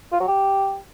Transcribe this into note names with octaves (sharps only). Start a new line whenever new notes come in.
F4
F#3
G4